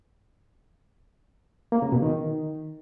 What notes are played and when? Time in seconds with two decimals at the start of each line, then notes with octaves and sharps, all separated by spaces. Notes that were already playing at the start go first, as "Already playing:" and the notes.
1.72 A#3
1.82 C#3
1.92 B2
2.02 D#3